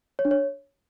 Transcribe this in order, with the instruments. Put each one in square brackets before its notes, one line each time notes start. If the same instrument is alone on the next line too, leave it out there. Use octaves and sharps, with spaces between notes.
[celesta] C#5
D4
C#5